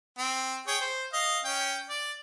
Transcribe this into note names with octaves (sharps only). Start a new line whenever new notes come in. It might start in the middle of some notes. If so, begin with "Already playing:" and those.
C4
G#4 C#5 G5
C5
D#5 F5
C#4 G5
D5